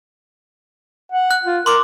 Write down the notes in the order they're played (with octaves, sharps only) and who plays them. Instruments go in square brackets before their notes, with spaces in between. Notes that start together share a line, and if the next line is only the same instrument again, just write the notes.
[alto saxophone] F#5
[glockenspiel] F#6
[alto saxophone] F4
[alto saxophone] A#4 [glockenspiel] C6 D6